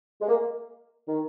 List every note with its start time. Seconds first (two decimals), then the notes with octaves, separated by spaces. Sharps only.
0.22 G#3
0.29 A#3
1.08 D#3